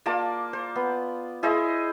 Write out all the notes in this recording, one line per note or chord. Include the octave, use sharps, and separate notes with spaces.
A#3 F4 D5 A5
C5
B3
E4 G#4 C5 D#5